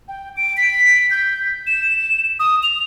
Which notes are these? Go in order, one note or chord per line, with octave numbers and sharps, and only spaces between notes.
G5
D7
B6
G6
E7
D#6
F7